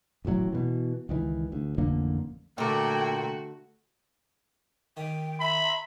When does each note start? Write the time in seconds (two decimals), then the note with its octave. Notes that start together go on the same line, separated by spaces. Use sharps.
0.25 D#1 A1 A2 F#3
0.52 B2 E3
1.09 C#2 D#3 E3
1.52 D2
1.78 A1 F2 D3 A#3
2.58 A#2 D3 A3 F#4 A#4 G5
4.97 D#3 G5
5.40 E5 B5